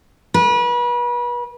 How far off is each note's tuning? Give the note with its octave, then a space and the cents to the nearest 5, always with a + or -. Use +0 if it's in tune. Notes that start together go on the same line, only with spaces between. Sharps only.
B4 -35